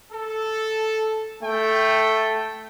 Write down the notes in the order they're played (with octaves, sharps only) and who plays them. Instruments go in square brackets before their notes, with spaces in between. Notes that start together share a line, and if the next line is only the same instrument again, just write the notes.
[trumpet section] A4
[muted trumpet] A3 [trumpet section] G5